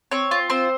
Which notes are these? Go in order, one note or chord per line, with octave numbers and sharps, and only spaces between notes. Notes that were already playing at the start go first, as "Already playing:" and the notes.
C4 C#5
F4
C4 C5